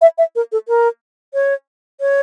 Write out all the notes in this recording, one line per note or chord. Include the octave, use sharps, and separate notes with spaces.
E5
E5
A#4
A4
A#4
C#5
C#5